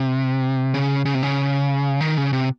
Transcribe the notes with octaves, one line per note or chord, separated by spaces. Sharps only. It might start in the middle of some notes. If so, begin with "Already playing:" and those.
Already playing: C3
C#3
C#3
C3
C#3
D#3
C#3
C3